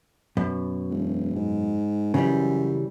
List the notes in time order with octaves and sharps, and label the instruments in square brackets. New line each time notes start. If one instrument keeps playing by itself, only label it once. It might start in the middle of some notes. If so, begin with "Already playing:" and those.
[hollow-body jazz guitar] F#2 B2
[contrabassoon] E1
G#2
[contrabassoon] F#2 [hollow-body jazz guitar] C#3 E3 G3